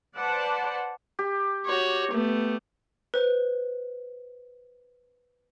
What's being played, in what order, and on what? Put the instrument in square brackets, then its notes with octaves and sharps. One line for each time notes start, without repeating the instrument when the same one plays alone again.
[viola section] B4 C5 D5 F#5 A5
[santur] G4
[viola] F#4 C#5
A3 B3
[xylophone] B4 C5